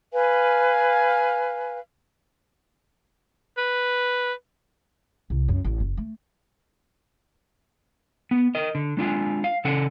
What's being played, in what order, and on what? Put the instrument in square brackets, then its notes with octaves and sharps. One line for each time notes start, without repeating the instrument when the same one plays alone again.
[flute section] B4 F5 G#5
[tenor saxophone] B4
[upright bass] C2
F#2
A1
F#1
A3
[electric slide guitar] B3
A#4 D#5
D3
G#3 D4 F4 G#5
F5
C#3 C#4 A4 F#5